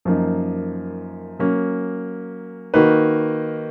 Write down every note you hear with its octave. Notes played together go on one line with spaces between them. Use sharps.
F#2 F3 A#3 D#4
F#3 A#3 C#4
D#3 A#3 D#4 F#4 B4